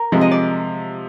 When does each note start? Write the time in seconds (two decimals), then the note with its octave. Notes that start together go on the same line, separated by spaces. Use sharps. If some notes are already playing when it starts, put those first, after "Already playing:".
Already playing: A#4
0.12 C3 F3 G#3
0.21 D#5
0.31 D5